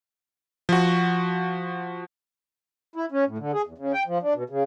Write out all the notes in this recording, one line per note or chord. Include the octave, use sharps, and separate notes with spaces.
F3 F#4
E4
C#4
A2
D3
G#4
E2
C#3
G5
F3
D4
B2
C#3